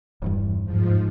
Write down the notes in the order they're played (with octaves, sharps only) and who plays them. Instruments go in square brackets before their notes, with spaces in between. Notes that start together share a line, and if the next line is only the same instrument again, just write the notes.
[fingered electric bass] D#1 E2 G2
[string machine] G#2 F3